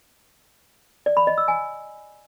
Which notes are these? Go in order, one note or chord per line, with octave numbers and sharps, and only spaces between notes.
D5
B5
D#5
E6
G#5